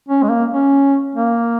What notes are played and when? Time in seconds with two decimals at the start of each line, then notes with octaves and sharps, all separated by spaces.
0.08 C#4
0.23 G#3
0.29 A#3
0.50 C#4
1.15 A#3